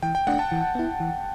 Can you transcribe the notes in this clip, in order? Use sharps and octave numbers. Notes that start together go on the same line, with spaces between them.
E3 G5
G5
A3 D4 F#5
A5
E3
B3 E4
E3